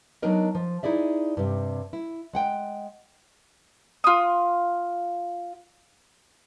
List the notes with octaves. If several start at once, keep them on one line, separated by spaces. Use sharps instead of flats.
F#3 B3 D4 D#4 A#4 D#5
F3
D#4 E4 G#4 D5 E5
G2 C3
E4
G#3 F#5 G5
F4 D#6